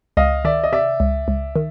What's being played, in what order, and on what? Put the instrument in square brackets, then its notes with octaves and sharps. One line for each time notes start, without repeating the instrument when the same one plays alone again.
[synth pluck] C#2 [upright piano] D#5 F5
[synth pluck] D#3 [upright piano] D5 E5
[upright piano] D#5
[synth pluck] C3 [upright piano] D5 E5
[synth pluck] C#2
C#2
D#3